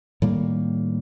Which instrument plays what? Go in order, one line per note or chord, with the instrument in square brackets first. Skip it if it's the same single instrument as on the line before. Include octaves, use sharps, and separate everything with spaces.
[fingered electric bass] A2 D#3 G3 A#3